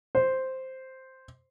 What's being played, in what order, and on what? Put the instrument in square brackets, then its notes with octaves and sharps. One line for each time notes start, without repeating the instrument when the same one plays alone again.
[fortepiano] C5